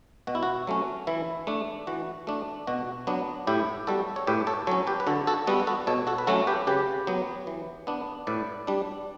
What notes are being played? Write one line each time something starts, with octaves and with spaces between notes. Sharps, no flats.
B2 F#4
E4
F#4
F#3 A3 C#4
E3 E4
A3 D4
E3 F#4
A3 D4
B2 F#4
F#3 B3 D4
A2 E4 G4
G3 B3 F#4 A4
C#5
A2 G4 B4
A4 C#5
F#3 C#4 A4 C#5
G4 B4
B4
D3 F#4 A4
F#4 A4
G3 B3 F#4
B4
F#4 A4
B2 A4 C#5
F#4 A4
B4
F#3 A3 C#4 F#4 A4
G4 B4
C#3 G4 B4
F#3 B3
E3
B3 D4
A2 B4 D5
G3 D4